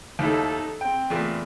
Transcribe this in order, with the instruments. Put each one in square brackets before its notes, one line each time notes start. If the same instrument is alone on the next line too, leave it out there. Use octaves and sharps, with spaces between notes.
[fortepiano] D#2 E4 [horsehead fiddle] D#4 A4
[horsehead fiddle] C4 [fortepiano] G5
[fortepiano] E2 A#2 A3